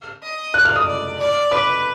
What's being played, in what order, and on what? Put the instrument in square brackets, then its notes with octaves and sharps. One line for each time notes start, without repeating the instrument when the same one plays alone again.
[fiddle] D#5
[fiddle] D5 [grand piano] F#6
[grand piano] F6
D#6
[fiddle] D5
D5
[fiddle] B4 [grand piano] D6